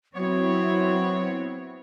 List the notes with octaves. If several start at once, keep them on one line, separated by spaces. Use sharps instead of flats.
F#3 B3 C4 E4 C#5